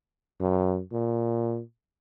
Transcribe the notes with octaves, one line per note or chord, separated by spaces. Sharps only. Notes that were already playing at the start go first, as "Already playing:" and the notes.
F#2
A#2